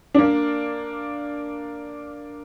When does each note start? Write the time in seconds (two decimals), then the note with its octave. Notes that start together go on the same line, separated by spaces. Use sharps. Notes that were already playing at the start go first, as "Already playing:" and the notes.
0.15 A#3 D4